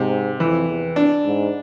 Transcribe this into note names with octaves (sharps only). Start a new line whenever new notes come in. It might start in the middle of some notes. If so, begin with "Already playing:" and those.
Already playing: G#2 C3
F2 E3
E2
D4
G#2